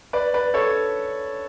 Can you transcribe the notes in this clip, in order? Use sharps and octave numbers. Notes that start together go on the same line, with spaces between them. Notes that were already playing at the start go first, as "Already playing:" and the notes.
B4 D5
B4 D5
A4 C#5